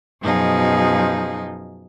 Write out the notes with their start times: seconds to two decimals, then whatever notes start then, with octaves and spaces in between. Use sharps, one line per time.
0.21 F#2 B2 F3 D#4 G#4